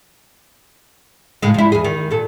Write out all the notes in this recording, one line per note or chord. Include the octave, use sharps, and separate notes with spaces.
A2 C#3 G#3
F3 E4
E2 G#4
D#3
A#2 A4